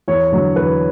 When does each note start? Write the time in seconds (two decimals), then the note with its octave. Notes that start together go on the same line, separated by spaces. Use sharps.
0.08 E2 C#5
0.32 D3 F#3
0.56 E2 B4